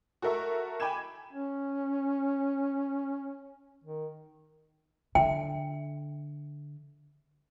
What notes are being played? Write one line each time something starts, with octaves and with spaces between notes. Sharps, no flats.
F#4 A4 A#4 E5 C#6
G5 G#5 B5 D6 G#6 E7
C#4
D#3
D3 E5 G5